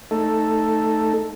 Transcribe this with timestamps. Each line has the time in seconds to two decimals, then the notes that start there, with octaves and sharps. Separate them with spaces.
0.11 A3 D#4 A4